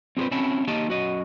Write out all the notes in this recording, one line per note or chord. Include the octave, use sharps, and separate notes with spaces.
C4 F4 G4 B4 C5
C4 C#4 E4 F#4 A5 B5
D#3 A#3 G4 D#5 A5
F#2 F#4 D#5